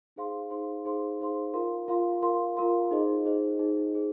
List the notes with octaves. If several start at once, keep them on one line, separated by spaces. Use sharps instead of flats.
D#4 G#4 C5 F5 C6
D#4 G#4 C5 F5 C6
D#4 G#4 C5 F5 C6
D#4 G#4 C5 F5 C6
F4 A#4 F5 C6
F4 A#4 F5 C6
F4 A#4 F5 C6
F4 A#4 F5 C6
D#4 G#4 C5 D#5
D#4 G#4 C5 D#5
D#4 G#4 C5 D#5
D#4 G#4 C5 D#5